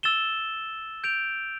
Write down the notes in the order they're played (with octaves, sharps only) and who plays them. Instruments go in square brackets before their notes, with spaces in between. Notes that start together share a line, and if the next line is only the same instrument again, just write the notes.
[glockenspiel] E6 A6 E7 G7
G6 D7 F7